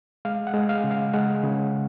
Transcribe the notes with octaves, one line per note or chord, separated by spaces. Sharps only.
G#3 F5
F#5
G#3
F5
C#3
F5
G#3 F#5
C#3